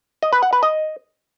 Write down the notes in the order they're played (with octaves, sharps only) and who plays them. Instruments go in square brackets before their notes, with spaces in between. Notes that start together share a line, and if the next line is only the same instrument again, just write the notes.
[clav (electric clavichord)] D#5
B4
F#5
B4
D#5